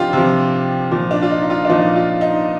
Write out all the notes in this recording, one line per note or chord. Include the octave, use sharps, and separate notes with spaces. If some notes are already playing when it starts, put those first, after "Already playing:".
Already playing: C3 F3 D4 D#4 F4 G4
C3 F3
A#2 F3
D4
F4
D#4
D#4
F4
D4
A#2 F3 D#4
F4
D#4